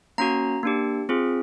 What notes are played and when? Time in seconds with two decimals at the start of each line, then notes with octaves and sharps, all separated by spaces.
0.18 A#3 C#4 F#4 A#5
0.63 A#3 D4 G4
1.09 C4 F4 G#4